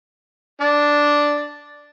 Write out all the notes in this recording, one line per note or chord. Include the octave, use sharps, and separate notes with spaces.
D4 D5